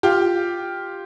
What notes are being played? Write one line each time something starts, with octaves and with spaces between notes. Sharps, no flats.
F4 G4